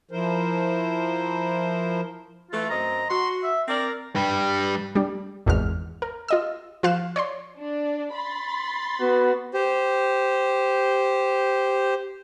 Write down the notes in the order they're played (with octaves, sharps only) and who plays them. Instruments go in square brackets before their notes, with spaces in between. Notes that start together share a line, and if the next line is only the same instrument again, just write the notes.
[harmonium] F3 E4 A#4 C5
[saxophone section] E3 A3 [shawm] F4
[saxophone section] F#2 C4 D#5 [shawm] A#5
[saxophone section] F#4 [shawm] C6
[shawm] E5
[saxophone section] C4 D5 [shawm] A#4
[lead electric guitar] G2 G3
[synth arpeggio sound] G3 D4
G#1 E2 G#3 F6
A#4
F4 D#5 E6
F3 F4 F5 F#6 E7
C#5 D5 C6
[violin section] D4 D5
B5 C6 A6
[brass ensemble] B3 F#4
[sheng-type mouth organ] G4 C5